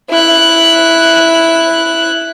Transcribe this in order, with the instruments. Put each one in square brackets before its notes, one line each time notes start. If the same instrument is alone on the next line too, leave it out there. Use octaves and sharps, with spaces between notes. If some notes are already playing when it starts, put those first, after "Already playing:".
[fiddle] E4 F#6